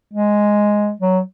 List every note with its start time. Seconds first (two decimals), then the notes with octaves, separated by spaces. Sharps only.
0.14 G#3
1.00 F#3